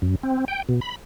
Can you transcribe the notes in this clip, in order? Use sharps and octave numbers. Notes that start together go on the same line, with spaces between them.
F#2
C4
G5
B2
B5